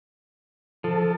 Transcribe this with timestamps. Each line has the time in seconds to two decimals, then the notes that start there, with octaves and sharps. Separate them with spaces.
0.84 F3 A4